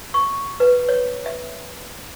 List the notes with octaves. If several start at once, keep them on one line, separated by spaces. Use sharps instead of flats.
C#6
B4
C#5
E5